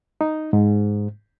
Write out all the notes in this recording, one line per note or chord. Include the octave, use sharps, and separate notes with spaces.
D#4
G#2